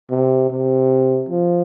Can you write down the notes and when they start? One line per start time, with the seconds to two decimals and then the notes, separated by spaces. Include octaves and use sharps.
0.11 C3
0.50 C3
1.29 F3